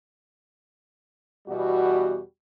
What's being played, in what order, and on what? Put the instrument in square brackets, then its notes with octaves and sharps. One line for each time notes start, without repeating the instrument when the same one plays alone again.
[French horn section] E2 B2 G3 F#4